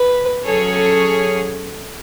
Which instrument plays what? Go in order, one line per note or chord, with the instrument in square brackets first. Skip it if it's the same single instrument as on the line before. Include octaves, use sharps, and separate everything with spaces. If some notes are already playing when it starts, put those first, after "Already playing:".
Already playing: [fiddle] B4
[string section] F#3 C#4 G#4 C#5 [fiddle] A4
[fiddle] A4